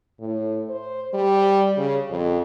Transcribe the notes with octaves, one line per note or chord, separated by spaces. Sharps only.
A2
C5
G3
C#3
F2